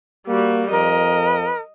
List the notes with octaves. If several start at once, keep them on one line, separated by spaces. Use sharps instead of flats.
G3 A#3 F#4
F2 A#4 D#5